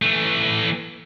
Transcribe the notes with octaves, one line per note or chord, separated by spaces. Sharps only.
E3 A3